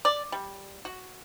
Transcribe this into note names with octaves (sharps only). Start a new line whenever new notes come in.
D5
G3
F#4